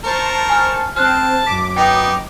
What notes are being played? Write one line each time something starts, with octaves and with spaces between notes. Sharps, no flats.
A#4 C5 A5 C#6
G#5 F6
C4 C5 A5 F6 F#6
F#2 D6 B6
B3 D#4 G5